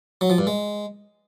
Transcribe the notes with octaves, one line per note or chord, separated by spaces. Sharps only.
F#3
F3
G2
G#3